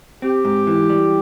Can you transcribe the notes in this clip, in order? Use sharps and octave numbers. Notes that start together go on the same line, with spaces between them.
C4 G4
G#2
E3
G3